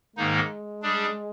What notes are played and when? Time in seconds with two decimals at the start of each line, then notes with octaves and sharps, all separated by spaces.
0.16 G#2 D#3 G#3 A#3 D#4
0.82 G3 D4 G#4